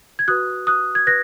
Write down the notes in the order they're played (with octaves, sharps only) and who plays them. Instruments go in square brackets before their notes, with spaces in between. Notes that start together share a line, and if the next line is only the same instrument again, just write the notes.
[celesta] G#6
F#4 B4 D#6 F#6
D#6 F#6
G#6
B4 F#6 A#6